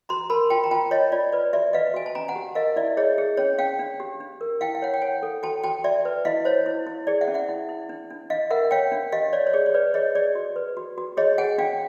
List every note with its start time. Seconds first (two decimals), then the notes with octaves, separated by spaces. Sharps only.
0.09 F#4 A#5 C6
0.30 A#4 A5 B5
0.50 F4 G5 A5
0.64 A#5
0.71 F4 G5 A5
0.91 F4 C#5 D#5
1.12 F4 D5
1.32 B4 D5
1.53 F#4 D5 E5
1.73 B4 D#5 F5
1.94 F#4 G#5
2.06 A5
2.15 C#4 G#5 A#5
2.28 F#5 G#5
2.36 G4
2.55 A#4 D#5 F5
2.76 E4 D5 E5
2.97 G#4 C#5 D#5
3.18 G#4
3.37 C#4 C#5
3.58 C#4 F5 G5
3.79 D4
4.00 G4
4.20 D4
4.41 A#4
4.61 E4 F5 G5
4.75 F5
4.82 C#5 F#5
4.94 G5
5.01 C#5 F#5 G#5
5.22 A4
5.43 F#4 G5 A5
5.63 F#4 G5 A5
5.84 F#4 D5 E5
6.05 B4
6.25 E4 D#5 F5
6.45 C5 C#5
6.66 E4
6.87 E4
7.07 G#4 D5
7.21 E5 F#5
7.28 C#4
7.34 E5 F#5
7.49 E4
7.69 E4
7.89 D4
8.10 D4
8.30 D4 D#5 F5
8.50 A#4 E5 F#5
8.71 C#5 F5 G5
8.92 D4
9.12 G4 D#5 F5
9.33 C#5 D5
9.47 C#5
9.53 G#4 D5
9.66 C#5
9.74 B4 D5
9.94 G#4 C#5 D#5
10.15 G#4 D5
10.35 F#4
10.56 B4
10.77 F#4
10.98 F#4
11.17 G#4 C#5 D#5
11.38 G#4 F#5 G#5
11.58 D4 F5 G5